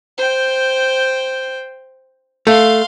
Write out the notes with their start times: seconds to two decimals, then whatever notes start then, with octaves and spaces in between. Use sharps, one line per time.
0.18 C5 G5
2.47 A3 F5 C6